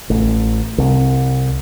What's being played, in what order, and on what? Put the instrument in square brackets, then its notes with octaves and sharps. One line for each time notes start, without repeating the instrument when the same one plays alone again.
[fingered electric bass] A1
C2